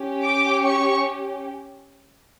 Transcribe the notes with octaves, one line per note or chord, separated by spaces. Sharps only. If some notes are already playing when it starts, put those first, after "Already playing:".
Already playing: C#4 G4
D6
C#6